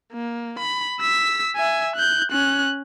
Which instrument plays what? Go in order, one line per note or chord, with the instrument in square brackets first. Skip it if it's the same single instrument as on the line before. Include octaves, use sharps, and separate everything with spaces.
[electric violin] A#3
B5
E6 B6
E5 G#5
F#6 G6
C#4 F#6